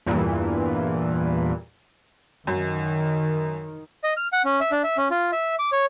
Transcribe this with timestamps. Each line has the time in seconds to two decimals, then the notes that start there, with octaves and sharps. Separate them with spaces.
0.06 E2 G2 A#2 E3
2.47 F#2 D#3
4.04 D#5
4.17 F6
4.33 F#5
4.45 C#4
4.61 E5
4.72 D4
4.84 E5
4.97 C#4
5.11 F4
5.32 E5
5.59 D6
5.72 C#5